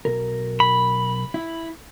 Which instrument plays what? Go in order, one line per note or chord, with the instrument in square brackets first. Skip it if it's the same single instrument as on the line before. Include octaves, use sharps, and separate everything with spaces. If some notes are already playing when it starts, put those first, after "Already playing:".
[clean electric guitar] B1 A#4
[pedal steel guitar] B5
[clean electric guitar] E4